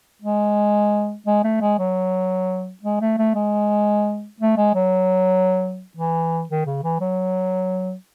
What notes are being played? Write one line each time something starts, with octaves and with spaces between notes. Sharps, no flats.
G#3
G#3
A3
G#3
F#3
G#3
A3
A3
G#3
A3
G#3
F#3
E3
D#3
C#3
E3
F#3